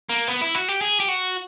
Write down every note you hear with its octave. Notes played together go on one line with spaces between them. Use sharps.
A#3
B3
E4
F#4
G4
G#4
G4
F#4